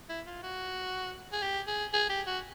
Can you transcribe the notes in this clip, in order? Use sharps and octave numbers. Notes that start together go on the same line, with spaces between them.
E4
F4
F#4
G#4
G4
G#4
G#4
G4
F#4